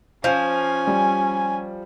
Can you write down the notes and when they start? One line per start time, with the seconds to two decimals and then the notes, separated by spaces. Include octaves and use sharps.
0.24 F3 C#4 F5 G#5
0.87 G3